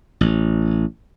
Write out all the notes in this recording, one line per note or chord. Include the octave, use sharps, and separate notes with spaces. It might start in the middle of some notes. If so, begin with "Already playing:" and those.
A1